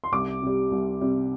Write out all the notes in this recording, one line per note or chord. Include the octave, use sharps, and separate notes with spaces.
C6
C2 D6
C3 G3
C2
C3 G3